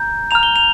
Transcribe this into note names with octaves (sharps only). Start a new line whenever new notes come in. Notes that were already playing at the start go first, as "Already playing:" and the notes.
Already playing: A#5 G6
A#5 F6 F7
G7
F7